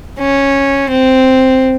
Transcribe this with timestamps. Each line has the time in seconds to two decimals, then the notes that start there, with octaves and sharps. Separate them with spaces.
0.20 C#4
0.90 C4